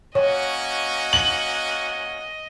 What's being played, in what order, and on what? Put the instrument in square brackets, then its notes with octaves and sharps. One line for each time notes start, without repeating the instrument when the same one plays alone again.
[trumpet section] A#3 C#4 F#4 [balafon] C#5 [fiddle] D#5
[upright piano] F#7